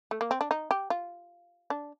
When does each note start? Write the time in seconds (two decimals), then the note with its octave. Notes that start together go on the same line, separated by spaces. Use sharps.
0.11 A3
0.21 A#3
0.31 C4
0.41 D4
0.51 D#4
0.71 G4
0.90 F4
1.70 D4